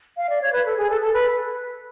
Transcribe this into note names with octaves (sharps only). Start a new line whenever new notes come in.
F5
D5
C#5
B4
A4
G#4
A4
A4
B4